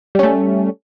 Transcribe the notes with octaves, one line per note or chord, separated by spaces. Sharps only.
G3 A3 C#4